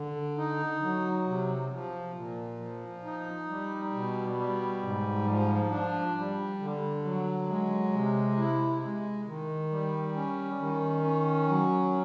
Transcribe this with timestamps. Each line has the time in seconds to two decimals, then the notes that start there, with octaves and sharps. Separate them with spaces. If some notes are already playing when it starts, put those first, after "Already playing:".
Already playing: D3
0.38 D#4
0.82 F#3
1.26 C3
1.71 F3
2.15 A#2
2.60 F3
3.04 D#4
3.48 G3
3.93 B2
4.37 G3
4.82 G#2
5.26 F3
5.70 D4
6.15 G3
6.60 D3
7.04 F#3
7.48 G#3
7.92 C3
8.37 E4
8.81 G#3
9.26 D#3
9.70 G3
10.15 C#4
10.59 D#3
11.04 C#4
11.48 F#3